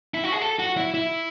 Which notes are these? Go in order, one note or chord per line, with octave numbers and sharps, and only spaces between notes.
E4
F#4
G#4
A4
F#4
E4
E4